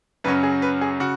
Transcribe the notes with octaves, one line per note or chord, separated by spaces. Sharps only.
F#2 C#3 F#3 C#4 B4
G#4
B4
G#4
C#3 F#4